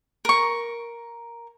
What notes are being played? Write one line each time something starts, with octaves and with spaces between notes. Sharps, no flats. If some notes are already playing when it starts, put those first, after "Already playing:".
A#4 C#6